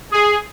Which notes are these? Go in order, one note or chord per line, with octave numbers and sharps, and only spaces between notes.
G#4